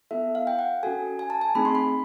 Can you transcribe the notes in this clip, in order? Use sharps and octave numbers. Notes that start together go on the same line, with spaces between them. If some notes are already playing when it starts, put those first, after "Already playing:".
B3 E4 A4 E5
F5
G5
F#5
C#4 F#4 A4 G#5
G#5
A5
G#5
A3 C4 D#4 G#4 B5
C6
B5